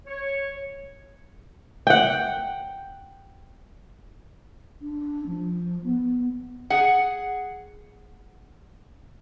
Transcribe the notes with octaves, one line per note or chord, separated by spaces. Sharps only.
C#5
F#5 G5
D4
F3
B3
G#4 F#5